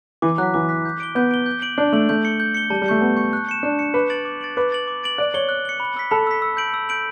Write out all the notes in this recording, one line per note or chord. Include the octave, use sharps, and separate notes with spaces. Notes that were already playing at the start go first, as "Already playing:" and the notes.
E3 D6
F#3 F#6 B6
E3 D6
F#6 B6
G6
D7 G7
B3 G6
D7 G7
G6
D7 F#7
D4 G6
A3 D7 F#7
A3 G6
C#7 G7
G6
C#7 G7
G3 A5
G3
A3 C#6 G6 C#7
B3 A5
C#6 G6 C#7
F#6
C#7 E7
D4 F#6
C#7 E7
B4 D6
A6 D7 F#7
D6
A6 D7 F#7
B4 D6
A6 D7 F#7
D6
A6 D7 F#7
D5 F#6
C#5 C#7 G7
F#6
C#7 G7
B5
E6 B6
A4 B5
E6 B6
E6
G6 D7 F#7
E6
G6 D7 F#7